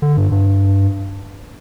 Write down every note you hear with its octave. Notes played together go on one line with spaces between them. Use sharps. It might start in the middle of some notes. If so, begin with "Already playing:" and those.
D3
G2
G2